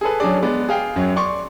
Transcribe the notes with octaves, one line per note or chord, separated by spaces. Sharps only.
G#4 A4 B4
F#3 C#4 D4 G#4 D5
G#3 B3 D5
G#4 F5 G5
F#2 F#3
D5 C6 C#6